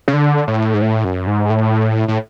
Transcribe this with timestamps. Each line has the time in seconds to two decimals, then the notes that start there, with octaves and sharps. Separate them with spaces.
0.08 C#3
0.13 D3
0.47 A2
0.74 G#2
0.82 A2
1.04 F#2
1.27 G#2
1.50 A2
2.08 A2